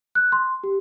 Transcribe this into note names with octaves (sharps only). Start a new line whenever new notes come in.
F#6
C6
G4